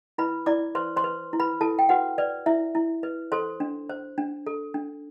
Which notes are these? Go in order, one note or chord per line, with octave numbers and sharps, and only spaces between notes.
E4 B4 B5
E4 D5 D6
B4 C5 C6
C5 C6
B4
E4
B4 B5
E4 A4 A5
G5
F#4 B4 F#5
B4 D5
E4 E5
E4
B4
A4 C5 C6
D4
C5
D4
A4
D4